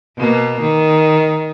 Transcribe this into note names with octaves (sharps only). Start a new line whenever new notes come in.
B2 A#3
D#3